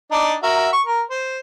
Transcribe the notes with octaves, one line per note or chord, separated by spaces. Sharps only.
D4 D#4 D5
F#4 A#4 E5
C#6
A#4
C5